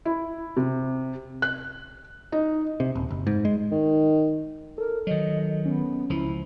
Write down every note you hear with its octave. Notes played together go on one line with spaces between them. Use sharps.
E4
C3
F#6
D#4
C3
D#1
F#1
G#2
G#3
D#3
A4 A#4
D#3 F#3 D#5
B3 C#4
C#2 F3 E4